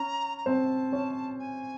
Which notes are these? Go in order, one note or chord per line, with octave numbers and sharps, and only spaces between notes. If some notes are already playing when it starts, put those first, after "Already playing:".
Already playing: C#4 A#5
A#5
C4 C5 A5
C#4 C#5
G#5